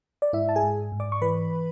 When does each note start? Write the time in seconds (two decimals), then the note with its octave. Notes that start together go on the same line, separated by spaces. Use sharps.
0.22 D5
0.33 G#2 E4 E5
0.49 A5
0.56 G#4 G#5
0.63 G#2
0.92 G#2
1.00 D5 D6
1.12 C#6
1.21 E3 B4 B5